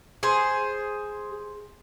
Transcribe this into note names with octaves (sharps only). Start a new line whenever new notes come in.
G#4 C5